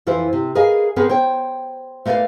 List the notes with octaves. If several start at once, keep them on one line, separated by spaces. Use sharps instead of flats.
F2 E3 F4 B4 C5
C3
G#4 A#4 B4 D#5 F5 G#5
B3 C4 G#4 A#4 B4
C5 C#5 G5
A3 A#3 B4 C5 D5 F5